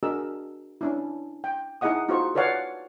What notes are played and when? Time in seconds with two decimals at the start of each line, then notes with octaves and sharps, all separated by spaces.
0.03 D4 F#4 G#4 A#4 D#5 E6
0.81 C#4 D4 E4
1.44 G5
1.81 D#4 E4 G#4 D#5 F#5 D#6
2.08 D#4 F4 F#4 G#4 C5 C#6
2.35 A4 B4 C#5 D5 F5 F#5